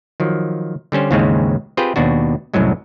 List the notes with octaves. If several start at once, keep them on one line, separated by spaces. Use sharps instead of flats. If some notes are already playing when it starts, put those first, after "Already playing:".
D#3 F3 F#3
D3 G3 C#4 C5
D#2 G#2 C#3 E3 G#3 C4
C4 F4 G4 G#4 B4 G5
D#2 B2 D4 F#4
C2 F#2 A2 F#3 G#3